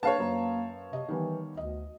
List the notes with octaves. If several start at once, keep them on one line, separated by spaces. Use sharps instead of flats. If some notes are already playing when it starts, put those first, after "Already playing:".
D4 B4 C#5 F5 A5
F#2 A#3 B4 C5
C3 D#5
D#3 E3 G3 B3
D2 D#5